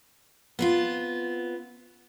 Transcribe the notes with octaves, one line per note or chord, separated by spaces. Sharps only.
B3 C4 F4